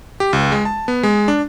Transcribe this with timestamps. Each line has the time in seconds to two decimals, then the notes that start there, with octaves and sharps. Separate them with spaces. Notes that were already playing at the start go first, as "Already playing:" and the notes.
0.20 G4
0.33 C#2
0.52 G#3
0.65 A5
0.88 B3
1.03 G#3
1.28 D4